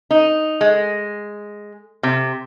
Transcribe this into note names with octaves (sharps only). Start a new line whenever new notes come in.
D#4
G#3
C3